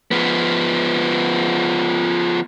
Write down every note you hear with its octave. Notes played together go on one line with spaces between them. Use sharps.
F3 B3